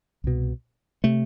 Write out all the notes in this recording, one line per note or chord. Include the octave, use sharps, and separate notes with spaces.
C2 B2
C3 A3